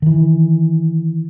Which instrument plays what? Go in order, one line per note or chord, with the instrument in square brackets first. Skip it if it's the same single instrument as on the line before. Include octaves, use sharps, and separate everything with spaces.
[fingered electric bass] D#3 E3